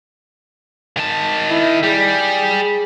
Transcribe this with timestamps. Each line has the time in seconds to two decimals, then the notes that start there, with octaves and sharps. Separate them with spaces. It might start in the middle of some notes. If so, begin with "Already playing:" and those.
0.97 D#3 A5
1.50 E4
1.83 G3 G#4